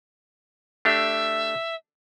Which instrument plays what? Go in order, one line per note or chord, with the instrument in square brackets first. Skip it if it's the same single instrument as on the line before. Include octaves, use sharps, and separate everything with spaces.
[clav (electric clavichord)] A3 D4 G4 [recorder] E5